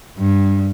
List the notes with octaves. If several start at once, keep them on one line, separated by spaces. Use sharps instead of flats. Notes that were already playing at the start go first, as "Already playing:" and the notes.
G2